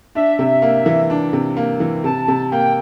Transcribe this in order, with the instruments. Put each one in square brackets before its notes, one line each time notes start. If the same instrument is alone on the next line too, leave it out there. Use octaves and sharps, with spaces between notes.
[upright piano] D4 [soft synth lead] E5
[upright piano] C3
A#3
E3
D4
C3
A#3
E3
[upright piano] C3 [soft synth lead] A5
[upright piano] C3
[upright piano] A#3 [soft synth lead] G5